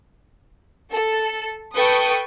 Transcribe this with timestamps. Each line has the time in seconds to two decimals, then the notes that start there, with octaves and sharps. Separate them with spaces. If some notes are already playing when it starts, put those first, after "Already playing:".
0.92 A4
1.74 A4 B4 G5 C#6 D#6